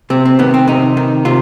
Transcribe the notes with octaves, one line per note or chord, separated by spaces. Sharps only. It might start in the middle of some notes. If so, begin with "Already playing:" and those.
C3 C4
C4
D#3 B3
C4
C3 D#4
D#3
C3 F4